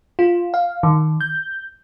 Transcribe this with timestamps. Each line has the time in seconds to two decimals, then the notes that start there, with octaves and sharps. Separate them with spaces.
0.19 F4
0.54 F5
0.83 D#3
1.21 G6